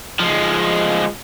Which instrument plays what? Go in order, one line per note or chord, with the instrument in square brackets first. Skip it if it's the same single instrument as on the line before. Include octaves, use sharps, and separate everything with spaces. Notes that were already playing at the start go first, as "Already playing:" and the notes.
[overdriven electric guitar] F3 G#3